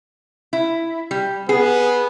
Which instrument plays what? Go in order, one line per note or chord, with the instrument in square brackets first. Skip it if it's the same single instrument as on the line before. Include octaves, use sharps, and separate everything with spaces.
[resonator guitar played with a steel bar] E4
G3
[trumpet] B3 [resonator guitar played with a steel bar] G#4